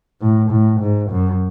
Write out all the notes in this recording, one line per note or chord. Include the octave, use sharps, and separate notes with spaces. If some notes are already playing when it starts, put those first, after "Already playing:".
A2
A2
G#2
F#2